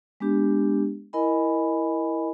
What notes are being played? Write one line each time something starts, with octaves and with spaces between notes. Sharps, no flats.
G#3 B3 D4 G4
E4 A#4 D#5 G#5 B5